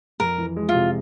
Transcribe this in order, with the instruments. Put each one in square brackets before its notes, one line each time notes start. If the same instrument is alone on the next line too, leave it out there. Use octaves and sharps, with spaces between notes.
[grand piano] F2 [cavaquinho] A#4
[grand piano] E3
G#3
[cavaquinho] F4
[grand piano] C3